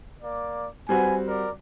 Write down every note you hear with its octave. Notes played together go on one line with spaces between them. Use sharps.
A#3 D5
G3 C4 F#4 B4 G#5
A#4 D5